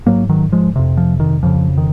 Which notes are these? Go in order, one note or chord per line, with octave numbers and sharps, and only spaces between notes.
G#2 F#3 A#3
D#3 F#3
F3 G#3
F2 C3
F3
D#3
F2 C#3 F3
D#3